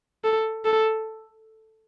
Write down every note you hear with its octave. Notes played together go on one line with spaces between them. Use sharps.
A4
A4